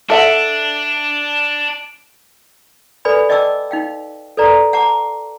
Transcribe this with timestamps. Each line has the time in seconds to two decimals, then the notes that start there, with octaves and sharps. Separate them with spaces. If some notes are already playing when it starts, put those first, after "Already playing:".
0.10 D4 A4 E5 F#5
3.05 A4 B4 D5 G#5 B5
3.29 D5 D#5 G5 A5 D6 E6
3.71 D#4 F5 G5
4.37 A4 B4 D5 A#5
4.73 F#5 A5 A#5 D6